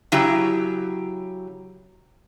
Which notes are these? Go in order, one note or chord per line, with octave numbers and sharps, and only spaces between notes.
C#3 F#3 E4 G4